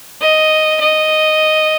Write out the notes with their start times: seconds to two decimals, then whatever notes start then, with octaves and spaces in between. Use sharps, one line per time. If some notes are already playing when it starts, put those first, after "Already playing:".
0.21 D#5
0.80 D#5